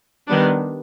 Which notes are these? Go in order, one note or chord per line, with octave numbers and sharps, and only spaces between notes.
D#3 G3 B3 D4